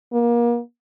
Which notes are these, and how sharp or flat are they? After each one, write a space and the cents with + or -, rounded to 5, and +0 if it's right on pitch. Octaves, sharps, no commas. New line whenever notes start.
A#3 +30